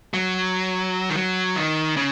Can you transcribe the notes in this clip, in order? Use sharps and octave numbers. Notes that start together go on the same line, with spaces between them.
F#3
D#3
F#3
D#3
C#3